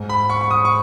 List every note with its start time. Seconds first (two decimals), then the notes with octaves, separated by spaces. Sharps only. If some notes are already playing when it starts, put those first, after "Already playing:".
Already playing: G#2
0.09 B5
0.29 C#6
0.41 C#6
0.51 D#6
0.65 C#6